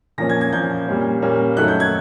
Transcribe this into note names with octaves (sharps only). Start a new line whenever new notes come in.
A#2 F3 A#3 C#4 A#6
G#6
G#6
A#2 F3 A#3 C#4 G6
A#2 G3 A#3 C#4
A#2 G3 A#3 C#4
F#2 D#3 F#3 A3 F#6
G6
G#6